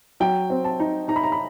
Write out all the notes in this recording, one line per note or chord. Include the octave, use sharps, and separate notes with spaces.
F#3 G5
C4
A5
D#4
D#4 A#5
B5
A#5
B5